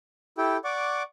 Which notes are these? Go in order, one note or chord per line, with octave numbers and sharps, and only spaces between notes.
E4 G4 A4 G5
D5 F#5 C#6 D6